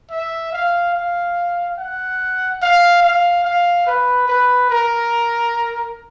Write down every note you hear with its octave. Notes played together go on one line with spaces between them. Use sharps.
E5
F5
F5
F#5
F5
F5
F5
B4
B4
A#4